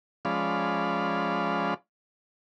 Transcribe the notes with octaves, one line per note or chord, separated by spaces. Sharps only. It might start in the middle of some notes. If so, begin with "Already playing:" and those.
F3 G#3 C#4 D5 F5 B5